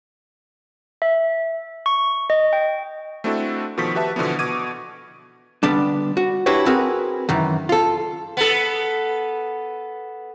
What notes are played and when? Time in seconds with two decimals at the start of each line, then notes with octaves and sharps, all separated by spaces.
1.02 E5
1.86 C#6
2.30 D#5
2.53 G5
3.24 A3 C4 D4 E4 F#4 A4
3.78 B2 D#3 F3 A4 C#6 B6
3.95 F#4 G4 B4 E5 A5
4.16 B2 D3 E3 F3 B3
4.39 B2 C#6 D6 G#6 D#7
5.63 D3 G3 B3 D4
6.17 F#4
6.46 D4 E4 F#4 G4 B4 C#5
6.66 C4 F#4 G#4 A#4 B4
7.29 F#2 D#3 E3
7.69 F4 A4
8.37 B3 A4